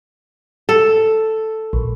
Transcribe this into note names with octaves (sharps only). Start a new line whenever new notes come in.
A4
A#1